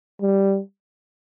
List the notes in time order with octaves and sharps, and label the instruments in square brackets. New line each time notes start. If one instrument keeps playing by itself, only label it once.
[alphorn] G3